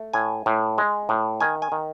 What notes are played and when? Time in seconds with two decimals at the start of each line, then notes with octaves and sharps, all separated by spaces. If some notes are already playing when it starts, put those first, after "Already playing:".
Already playing: A3
0.14 A2 G#5
0.46 A2
0.78 G#3
1.09 A2
1.40 D#3 G#5
1.62 G#5
1.72 D#3